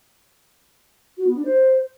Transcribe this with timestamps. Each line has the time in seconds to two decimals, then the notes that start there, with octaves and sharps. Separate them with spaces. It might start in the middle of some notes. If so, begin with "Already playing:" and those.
1.17 F#4
1.26 B3
1.35 D4
1.45 C5